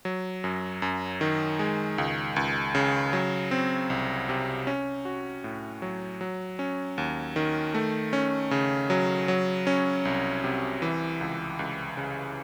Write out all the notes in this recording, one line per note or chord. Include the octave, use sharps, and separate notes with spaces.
F#3
F#2
F#2
D#3
G#3
C#2
C#2
C#3
F#3
C4
C2
C3
C#4
F#4
A2
F#3
F#3
C#4
D#2
D#3
A3
C#4
C#3
F#3
F#3
C#4
C2
C3
E3
C#2
C#2
C#3